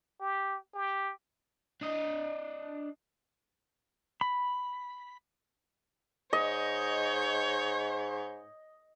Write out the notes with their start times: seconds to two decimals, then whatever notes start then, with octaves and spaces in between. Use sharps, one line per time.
0.21 G4
0.74 G4
1.81 D4 D#5
4.21 B5
6.33 G#2 C#5 D#5 G6